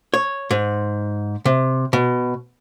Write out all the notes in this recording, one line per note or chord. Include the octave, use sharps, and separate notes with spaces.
C#5
G#2
C3
B2